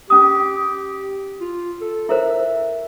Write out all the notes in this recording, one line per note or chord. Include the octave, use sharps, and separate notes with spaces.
C#4 G4 D#6
F4
A4
E4 A#4 C5 E5